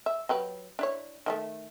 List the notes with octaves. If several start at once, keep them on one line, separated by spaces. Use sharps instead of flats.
E5
F#3 G4 B4
D4 E4 C#5
D#3 F3 A3